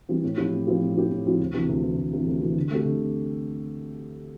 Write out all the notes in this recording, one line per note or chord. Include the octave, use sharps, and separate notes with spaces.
E3 G3 C4
A2
F3 C4 E4 G4
A2
F3 C4 E4 G4
A2
F3 C4 E4 G4
A2
F3 C4 E4 G4
D2
C3 E3
D2
C3 E3
D2
C3 E3
D2
C3 E3
D3
A3 C4 G4
D3